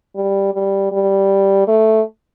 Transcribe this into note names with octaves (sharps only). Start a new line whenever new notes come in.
G3
G3
G3
A3